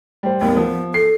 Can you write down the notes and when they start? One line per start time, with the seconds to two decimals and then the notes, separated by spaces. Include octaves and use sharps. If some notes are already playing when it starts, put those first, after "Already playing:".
0.23 G3 C5
0.41 D#2 G3 B3
0.57 F3
0.94 A4 C7